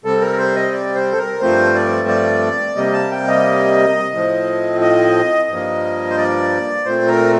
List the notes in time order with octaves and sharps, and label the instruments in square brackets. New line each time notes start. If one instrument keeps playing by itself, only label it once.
[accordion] C3 G3 C4 A4
A#4
C5
D#5
D5
C5
A4
A#4
G2 F3 A3 C4 C5
D5
D5
C3 G3 A#3 D#5
A5
G5
D#5
A2 F3 C4
D#5
G2 F3 A#3
C5
D5
A#2 A3 C4 C5
A#4